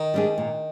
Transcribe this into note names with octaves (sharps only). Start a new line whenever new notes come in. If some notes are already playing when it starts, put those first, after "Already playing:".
Already playing: D#3
G3 D4 G#4
A#2